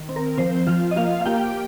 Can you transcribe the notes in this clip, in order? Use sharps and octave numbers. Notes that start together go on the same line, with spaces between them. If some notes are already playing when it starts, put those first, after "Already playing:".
Already playing: D#3
C4
A#4
F3 C4 C5
F3 F4 F5
D#5
A#3 F4 F5
F5
A#3 G4 G5